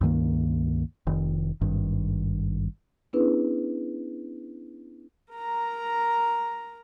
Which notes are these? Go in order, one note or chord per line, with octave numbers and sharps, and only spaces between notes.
C#2 G2 D#3 A#3
F1 D#3
G#1 G2 D#3
B3 C#4 D4 E4 G#4 B4
A#4 A#5